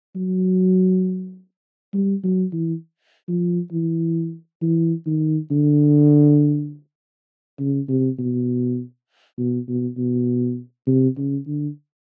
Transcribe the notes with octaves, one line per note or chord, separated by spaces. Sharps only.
F#3
G3
F#3
E3
F3
E3
E3
D#3
D3
C#3
C3
B2
B2
B2
B2
C3
C#3
D3